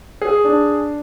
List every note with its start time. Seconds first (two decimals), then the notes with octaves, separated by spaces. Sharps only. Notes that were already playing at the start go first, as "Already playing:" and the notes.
0.21 G#4
0.44 D4